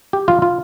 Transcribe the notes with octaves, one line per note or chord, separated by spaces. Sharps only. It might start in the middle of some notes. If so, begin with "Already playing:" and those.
G4
F4
F4